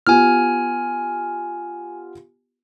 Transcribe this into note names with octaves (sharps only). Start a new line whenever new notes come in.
B3 F4 G4 G#5 F6